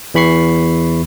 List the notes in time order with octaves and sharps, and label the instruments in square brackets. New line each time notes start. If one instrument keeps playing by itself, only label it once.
[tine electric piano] E2 E3 B5 C#6 C7